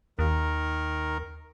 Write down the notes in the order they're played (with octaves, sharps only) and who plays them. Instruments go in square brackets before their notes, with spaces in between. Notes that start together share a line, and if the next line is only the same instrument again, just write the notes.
[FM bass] D#2 [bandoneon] D#3 A#4